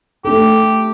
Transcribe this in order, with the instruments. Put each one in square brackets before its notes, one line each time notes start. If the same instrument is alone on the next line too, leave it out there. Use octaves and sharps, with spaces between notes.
[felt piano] A3 D4 A4 [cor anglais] G4